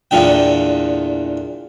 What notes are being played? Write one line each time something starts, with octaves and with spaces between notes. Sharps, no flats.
E2 A#2 D3 G5